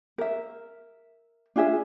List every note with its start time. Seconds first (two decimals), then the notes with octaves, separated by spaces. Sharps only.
0.18 A#4 E5
1.56 D4 F4 G#4 E5